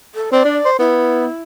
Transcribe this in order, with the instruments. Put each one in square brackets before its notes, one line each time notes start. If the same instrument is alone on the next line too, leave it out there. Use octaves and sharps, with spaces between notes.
[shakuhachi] A4
[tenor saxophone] C4 [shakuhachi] D5
[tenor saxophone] D4
C5
[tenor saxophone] B3 [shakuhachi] E4